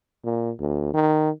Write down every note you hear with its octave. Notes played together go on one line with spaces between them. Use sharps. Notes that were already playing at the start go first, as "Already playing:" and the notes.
A#2
D2
D#3